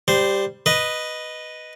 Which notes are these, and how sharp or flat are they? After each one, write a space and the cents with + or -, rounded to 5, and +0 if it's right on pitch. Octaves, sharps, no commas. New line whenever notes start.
G3 +5 C5 -10
B4 +0 D#5 +0